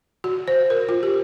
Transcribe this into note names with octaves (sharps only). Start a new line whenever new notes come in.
F#4
C5
A#4
F4
G4